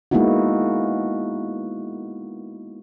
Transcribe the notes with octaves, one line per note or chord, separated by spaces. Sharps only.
G#3 A#3 B3 D#4 E4 F#4